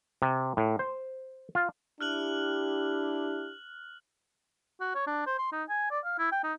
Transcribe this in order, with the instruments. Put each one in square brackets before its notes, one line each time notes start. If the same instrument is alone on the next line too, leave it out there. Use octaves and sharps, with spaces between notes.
[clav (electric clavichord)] C3
A2
C5
F4
[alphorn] D4 [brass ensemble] E4 G4 [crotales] F6 F#6 F#7
[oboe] F#4
C#5
D4
C5
C6
D#4
G#5
D5
F5
E4
G5
D#4